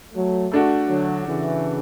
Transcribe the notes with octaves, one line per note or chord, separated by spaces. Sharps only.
F#3 A3
A3 D4 F#4
D3 F#3
C#3 E3